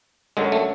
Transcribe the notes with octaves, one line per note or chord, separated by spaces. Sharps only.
F#2 D3 F#3 G#3
A3